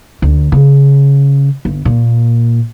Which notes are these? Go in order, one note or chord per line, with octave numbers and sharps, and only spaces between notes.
D2
C#3
G1
A#2